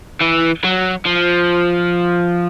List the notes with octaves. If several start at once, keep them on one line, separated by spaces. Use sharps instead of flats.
E3
F#3
F3